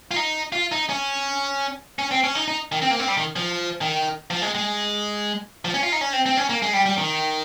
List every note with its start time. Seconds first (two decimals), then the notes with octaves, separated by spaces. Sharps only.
0.11 F4
0.16 D#4
0.52 F4
0.72 D#4
0.89 C#4
1.99 C#4
2.11 C4
2.24 C#4
2.35 D#4
2.48 D#4
2.72 D#3
2.82 C4
2.91 A#3
2.99 C4
3.08 G3
3.17 D#3
3.36 F3
3.81 D#3
4.30 F3
4.42 G#3
4.55 G#3
5.65 F3
5.74 C#4
5.83 F4
5.92 D#4
6.01 C#4
6.13 C4
6.26 C4
6.37 C#4
6.49 A#3
6.62 G#3
6.73 G3
6.86 G3
6.98 D#3